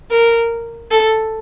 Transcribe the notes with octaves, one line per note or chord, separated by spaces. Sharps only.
A#4
A4